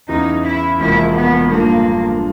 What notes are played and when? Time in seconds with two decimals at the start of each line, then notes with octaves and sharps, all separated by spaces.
0.09 E2 C#3 E3 D#4
0.44 E4
0.79 E1 E2 C3 F3 A#3 E4
1.15 B3
1.50 G2 D3 F3 A#3